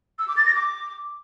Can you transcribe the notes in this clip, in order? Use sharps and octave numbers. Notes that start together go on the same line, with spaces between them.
E6
D6
A6
A#6
D6